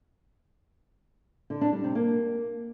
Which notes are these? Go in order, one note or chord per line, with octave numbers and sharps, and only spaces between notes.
D3
D4
G3
C3
A#3